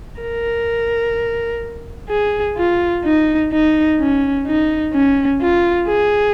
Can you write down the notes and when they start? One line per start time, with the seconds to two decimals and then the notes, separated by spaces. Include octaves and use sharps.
0.22 A#4
2.10 G#4
2.58 F4
3.05 D#4
3.52 D#4
4.00 C#4
4.47 D#4
4.94 C#4
5.41 F4
5.88 G#4